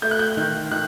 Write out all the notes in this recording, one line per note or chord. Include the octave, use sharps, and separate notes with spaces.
A3 G6
F#6
G6
D#3
D#3 F#6